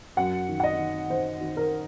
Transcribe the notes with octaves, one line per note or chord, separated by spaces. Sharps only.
F#2 F#5
D#3
F#5
D#5
D#3
D#3 C5
D#3
A#4